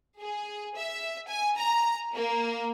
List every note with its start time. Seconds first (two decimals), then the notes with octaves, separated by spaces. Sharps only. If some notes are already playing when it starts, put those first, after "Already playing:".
0.20 G#4
0.76 E5
1.28 G#5
1.58 A#5
2.15 A#3